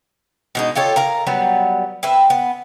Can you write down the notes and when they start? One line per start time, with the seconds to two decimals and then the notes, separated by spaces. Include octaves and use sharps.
0.55 B2 G#3 D#4
0.75 F4 G4 A4 C#5
0.96 A#4 F5 A#5
1.27 F#3 G3 B3
2.03 C4 B4 E5
2.30 B3